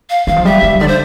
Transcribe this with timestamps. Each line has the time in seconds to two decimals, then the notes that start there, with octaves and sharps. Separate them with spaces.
0.10 F5
0.27 E3 F5
0.36 F3
0.45 G3 E5
0.63 G3
0.72 C3
0.81 D3 D5
0.88 C5